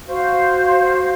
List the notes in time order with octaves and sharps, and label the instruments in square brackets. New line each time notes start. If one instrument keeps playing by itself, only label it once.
[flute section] F#4 C5 F5